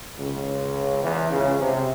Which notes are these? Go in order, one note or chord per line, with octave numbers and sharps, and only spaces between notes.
C#2 C#3
E2 E3
C#2 C#3
C3